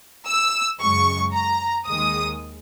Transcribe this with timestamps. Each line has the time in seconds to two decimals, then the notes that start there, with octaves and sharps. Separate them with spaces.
0.27 E6
0.80 F#2 C#3 G#3 C#6
1.33 A#5
1.86 D#2 D#3 G#3 D#6